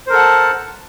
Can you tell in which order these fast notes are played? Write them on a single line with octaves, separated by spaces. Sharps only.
C5 A#4 A4 F#5 A5